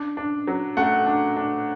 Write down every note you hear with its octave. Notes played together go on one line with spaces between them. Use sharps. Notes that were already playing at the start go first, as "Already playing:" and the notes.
Already playing: D4
D4
F#3
A3 F#5
D4
D4